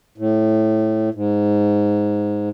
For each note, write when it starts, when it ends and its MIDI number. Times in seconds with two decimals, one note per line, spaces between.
0.18 1.09 45
1.14 2.49 44